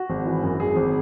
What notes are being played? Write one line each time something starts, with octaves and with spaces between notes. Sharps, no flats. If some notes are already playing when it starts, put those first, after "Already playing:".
Already playing: F#4
G#1
E3
F#2
G#1 G#4
G#1